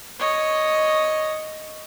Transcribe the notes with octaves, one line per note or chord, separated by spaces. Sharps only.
C#5 D#5